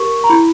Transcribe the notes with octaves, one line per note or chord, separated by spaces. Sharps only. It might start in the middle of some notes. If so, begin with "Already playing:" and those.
Already playing: G4 A#4 C#6
A#5
E4 B5